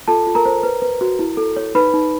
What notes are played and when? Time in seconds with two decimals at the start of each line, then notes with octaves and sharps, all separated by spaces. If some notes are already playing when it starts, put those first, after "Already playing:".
0.08 F4 A4 A5
0.26 F4
0.35 A#4 A#5
0.45 C5
0.63 B4
0.82 B4
1.01 F#4
1.19 E4
1.37 A4
1.56 C#5
1.75 D#4 B4 B5
1.94 D#4